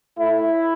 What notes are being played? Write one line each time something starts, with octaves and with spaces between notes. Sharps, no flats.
A2 A3 E4